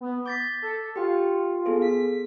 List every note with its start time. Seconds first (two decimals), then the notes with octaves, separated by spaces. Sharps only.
0.01 B3
0.26 D6 G6 A6 B6
0.62 A4
0.96 F4 G4 G5
1.66 B3 G#4 A4
1.82 B6